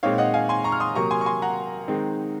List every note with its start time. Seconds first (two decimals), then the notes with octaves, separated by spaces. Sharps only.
0.03 A#2 G#3 C4 D#4 C#5 F5
0.18 D#5 F#5
0.34 F5 G#5
0.49 G#5 C6
0.64 A#5 C#6
0.72 F6
0.80 C6 D#6
0.95 C3 F#3 A#3 A#5 C#6
1.11 G#5 C6
1.21 C#6
1.26 G#5 C6
1.42 F#5 A#5
1.88 D#3 G#3 C4 D#4